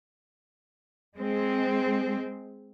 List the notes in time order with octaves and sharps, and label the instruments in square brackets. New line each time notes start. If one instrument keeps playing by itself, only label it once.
[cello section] G#3 C4